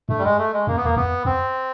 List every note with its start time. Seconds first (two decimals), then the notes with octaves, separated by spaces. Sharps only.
0.09 G2 A3
0.19 G3
0.24 G#3
0.38 A3
0.53 G#3
0.67 F#2 A#3
0.76 B3
0.84 E2 A#3
0.97 F2 B3
1.25 F2 C4